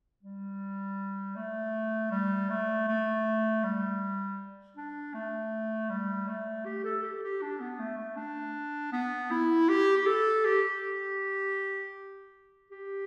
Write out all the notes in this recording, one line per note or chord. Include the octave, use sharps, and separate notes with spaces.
G3
A3
G3
A3
A3
G3
D4
A3
G3
A3
G4
A4
G4
G4
D4
B3
A3
A3
D4
B3
E4
G4
G4
A4
G4
G4